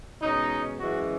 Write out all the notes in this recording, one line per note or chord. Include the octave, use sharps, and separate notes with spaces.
B2 G#3 C#4 D#4
F#2 C#3 E3 G#3 C#4 F#4